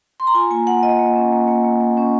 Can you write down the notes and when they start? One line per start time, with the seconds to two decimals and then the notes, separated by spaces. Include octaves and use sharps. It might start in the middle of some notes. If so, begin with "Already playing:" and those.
0.20 C6
0.27 A#5
0.35 F4 G#5
0.51 A#3 G#5
0.67 F4 F#5
0.83 F4 D#5
0.99 A#3
1.16 C#4
1.32 A#3
1.48 A#3
1.64 A#3
1.81 A#3
1.97 C#4